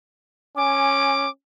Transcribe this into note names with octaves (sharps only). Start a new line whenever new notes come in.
C#4 G#5 D6